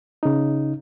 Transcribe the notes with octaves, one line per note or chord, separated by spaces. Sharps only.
C#3 D#4